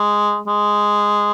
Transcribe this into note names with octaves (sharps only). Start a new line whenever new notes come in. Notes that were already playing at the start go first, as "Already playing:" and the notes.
Already playing: G#3
G#3